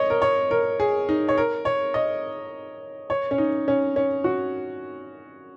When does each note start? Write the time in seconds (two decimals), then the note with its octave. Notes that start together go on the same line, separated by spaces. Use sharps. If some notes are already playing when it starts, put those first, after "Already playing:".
Already playing: C#5 D#5
0.10 A#4
0.22 C#5
0.51 A#4
0.80 G#4
1.09 D#4
1.29 C#5
1.38 A#4
1.65 C#5
1.94 D#5
3.10 C#5
3.31 C#4
3.38 D#4
3.68 C#4
3.96 C#4
4.24 F#4